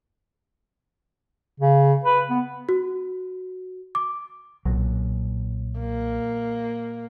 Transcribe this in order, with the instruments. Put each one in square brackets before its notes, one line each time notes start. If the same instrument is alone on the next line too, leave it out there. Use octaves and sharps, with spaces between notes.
[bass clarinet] C#3
B4
B3
[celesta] F#4
D6
[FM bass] B1 [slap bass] A#2 F#3
[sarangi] A#3